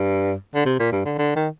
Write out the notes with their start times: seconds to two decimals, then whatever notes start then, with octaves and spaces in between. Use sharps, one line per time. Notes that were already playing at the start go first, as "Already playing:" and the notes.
Already playing: G2
0.55 D3
0.65 C3
0.79 A#2
0.92 G2
1.05 D3
1.18 D3
1.36 D#3